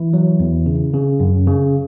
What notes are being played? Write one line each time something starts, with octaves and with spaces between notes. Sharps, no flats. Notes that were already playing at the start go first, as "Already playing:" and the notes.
Already playing: E3 E4
F#3
E2
C#3
C#3
F#2
C#3